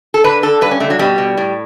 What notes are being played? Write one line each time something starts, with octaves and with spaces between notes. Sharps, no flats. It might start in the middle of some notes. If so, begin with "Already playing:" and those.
A4
D3 B4
D3 A4
G2 B4
C#4
D3 A3
F#3
B2 G3
B2
A2